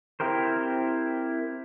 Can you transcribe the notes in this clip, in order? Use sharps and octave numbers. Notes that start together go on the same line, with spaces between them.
C4 E4 G4 A#4 C5